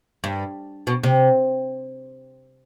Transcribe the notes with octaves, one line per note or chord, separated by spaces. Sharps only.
G2
B2
C3